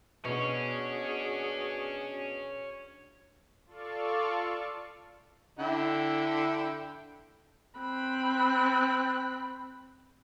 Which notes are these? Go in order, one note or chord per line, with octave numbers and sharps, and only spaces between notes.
B2 C#4 D4 F#4 G#4
F4 A4 D5 F5 C#6
D3 E4 G5
C4 B5 F#6